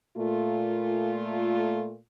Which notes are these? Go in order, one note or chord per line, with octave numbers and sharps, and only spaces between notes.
A#2 A3 F4